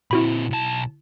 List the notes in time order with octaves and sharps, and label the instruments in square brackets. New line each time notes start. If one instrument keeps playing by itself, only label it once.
[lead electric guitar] A#2 C4 [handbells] E4 F#4 B5
[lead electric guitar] B1 A5